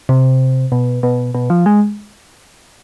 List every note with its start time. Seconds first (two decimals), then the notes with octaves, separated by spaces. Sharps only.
0.09 C3
0.72 B2
1.03 B2
1.35 B2
1.50 F3
1.66 G#3